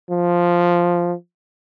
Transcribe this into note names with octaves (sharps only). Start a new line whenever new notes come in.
F3